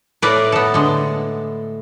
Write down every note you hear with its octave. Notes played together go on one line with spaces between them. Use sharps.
A2 A#4 B4 D5
B3 A4
D3 G#3